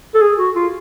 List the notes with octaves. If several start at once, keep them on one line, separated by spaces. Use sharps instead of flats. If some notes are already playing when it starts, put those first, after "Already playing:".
A4
G#4
F#4
F4